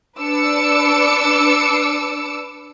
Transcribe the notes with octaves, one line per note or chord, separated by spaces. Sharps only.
D4 B4 D6 E6 C#7